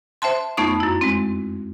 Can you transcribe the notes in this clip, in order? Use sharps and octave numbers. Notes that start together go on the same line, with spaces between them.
C5 E5 G5 A5 C6
F2 A3 B3 D#4 C#6 D#6
F#2 E4
G#3 C4